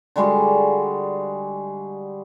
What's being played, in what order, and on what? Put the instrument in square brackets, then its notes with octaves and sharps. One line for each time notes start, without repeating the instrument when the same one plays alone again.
[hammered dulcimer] D3 G3 G#3 F#4